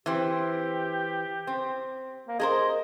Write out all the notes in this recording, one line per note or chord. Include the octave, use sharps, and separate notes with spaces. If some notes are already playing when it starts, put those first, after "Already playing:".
E3 C4 G4
C4
A#3
G#4 A#4 C5 D#5